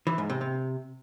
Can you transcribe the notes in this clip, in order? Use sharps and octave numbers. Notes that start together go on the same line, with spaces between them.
E3
G#2
C3
C3